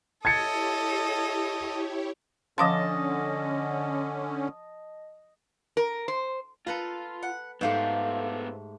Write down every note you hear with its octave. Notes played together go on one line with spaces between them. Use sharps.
E4 G4 A4 C#5 D#5 G#6 A6 C#7
D3 F3 C#4 D#5 F5 A5 C6
A#4
C5
F4 A4 B4 A#5
F#5
G#2 A3 B3 C4 F4 G4 A4 A#4